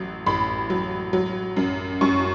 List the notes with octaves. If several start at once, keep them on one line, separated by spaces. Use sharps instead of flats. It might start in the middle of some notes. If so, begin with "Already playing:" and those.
Already playing: A1 F#3
A1 B5
F#3
F#3
F#2
F#2 C#6